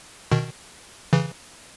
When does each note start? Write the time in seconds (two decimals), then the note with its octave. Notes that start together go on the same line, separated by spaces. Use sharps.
0.31 B2 D#3
1.13 C#3 E3